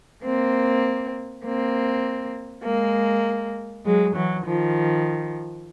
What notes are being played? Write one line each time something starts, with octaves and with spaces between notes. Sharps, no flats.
A#3 C4
A#3 C4
G#3 A#3
F#3 G#3
E3 F#3
D#3 F3